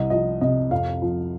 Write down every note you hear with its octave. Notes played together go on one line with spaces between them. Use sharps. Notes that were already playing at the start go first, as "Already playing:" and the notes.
Already playing: C2 D#5
F3 D#5
C3 D#5
F2 F5
F3